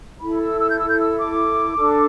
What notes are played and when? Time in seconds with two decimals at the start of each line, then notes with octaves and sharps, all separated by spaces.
0.20 E4 A4 B5
0.40 E6
0.60 E6
0.69 G6
0.79 E6
0.89 G6
0.99 E6
1.18 D6
1.77 D4 A4